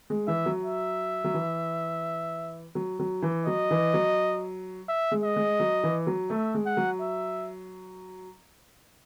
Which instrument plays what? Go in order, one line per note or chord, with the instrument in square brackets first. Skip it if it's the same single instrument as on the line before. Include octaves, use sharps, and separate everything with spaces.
[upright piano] G#3
[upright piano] E3 [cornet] E5
[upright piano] F#3
[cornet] E5
[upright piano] F#3
E3
F#3
F#3
E3
[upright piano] F#3 [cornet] D#5
[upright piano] E3
F#3
[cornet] E5
[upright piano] G#3
[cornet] D#5
[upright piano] G#3
F#3
E3
F#3
[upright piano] A3 [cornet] E5
[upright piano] G#3
[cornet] F#5
[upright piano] F#3
[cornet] E5